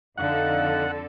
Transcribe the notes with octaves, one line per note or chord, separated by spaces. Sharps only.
F2 D3 D#4 A4 F5 F#5